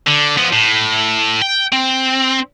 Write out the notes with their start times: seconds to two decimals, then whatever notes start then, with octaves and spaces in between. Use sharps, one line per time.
0.07 D3
0.37 F3 B3
0.53 A2
1.42 G5
1.72 C4